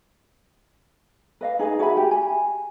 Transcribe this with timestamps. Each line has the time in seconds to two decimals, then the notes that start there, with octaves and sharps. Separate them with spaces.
1.41 B4 D#5 F5
1.59 D#4 G#4 B4 D#5
1.79 F#4 G#4 E5 B5
1.97 G4
2.11 G#5